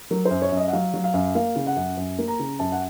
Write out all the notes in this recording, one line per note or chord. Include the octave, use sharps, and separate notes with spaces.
F#3 A#4
C5
F#2
C#5
F#2
D#5
F#5
F#3 F5
F#3
F5
F#2
A#3 F5
C#3
F#5
F#2
F#2
A#3
A#5
C#3
F#2 A5
F#5